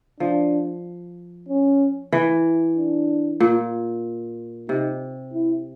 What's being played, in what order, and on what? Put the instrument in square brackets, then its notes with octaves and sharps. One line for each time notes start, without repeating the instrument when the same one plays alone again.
[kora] F3 [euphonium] D4
[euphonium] C#4
[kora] E3
[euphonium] D4
[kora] A#2
[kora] C3 [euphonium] D#4
[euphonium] E4